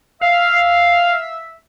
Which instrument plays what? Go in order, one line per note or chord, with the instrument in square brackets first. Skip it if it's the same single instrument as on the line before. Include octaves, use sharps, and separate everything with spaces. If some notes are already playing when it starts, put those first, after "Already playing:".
[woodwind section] E5 [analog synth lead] F5